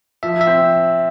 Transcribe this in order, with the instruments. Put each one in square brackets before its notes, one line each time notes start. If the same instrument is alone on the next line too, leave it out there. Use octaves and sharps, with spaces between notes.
[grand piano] F3 [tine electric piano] E5
[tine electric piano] E5
[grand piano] C4